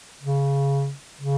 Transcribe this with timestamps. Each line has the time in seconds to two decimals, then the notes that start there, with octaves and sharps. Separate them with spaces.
0.22 C#3
1.21 C#3